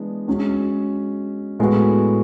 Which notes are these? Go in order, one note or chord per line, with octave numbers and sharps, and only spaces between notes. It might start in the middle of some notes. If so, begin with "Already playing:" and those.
Already playing: E3 G#3 B3 D4
G#3 C#4 F#4
A2 G#3 B3 F#4